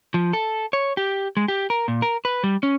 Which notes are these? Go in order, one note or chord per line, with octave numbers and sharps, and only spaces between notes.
F3
A4
C#5
G4
G#3
G4
A#4
A#2
A#4
B4
G3
C#4